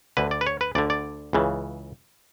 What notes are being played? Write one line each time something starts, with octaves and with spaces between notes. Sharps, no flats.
D2 D3 B4
D5
B4
C#5
B4
D2 D3 D5
D5
C#2 C#3 E3